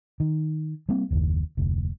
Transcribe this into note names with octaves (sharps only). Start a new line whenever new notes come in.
D#3
G3 A#3 C4
F#1 D#2
F1 D2